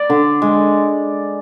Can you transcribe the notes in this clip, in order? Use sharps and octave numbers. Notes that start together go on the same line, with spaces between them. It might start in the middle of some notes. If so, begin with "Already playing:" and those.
Already playing: D5
D3
G#3